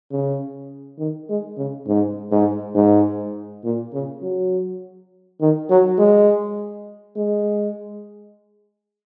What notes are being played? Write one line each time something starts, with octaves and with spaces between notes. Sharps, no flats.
C#3
D#3
G#3
C#3
G#2
G#2
G#2
A#2
C#3
F#3
D#3
F#3
G#3
G#3